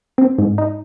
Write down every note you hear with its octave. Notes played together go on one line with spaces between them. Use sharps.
C4
G#2
D#4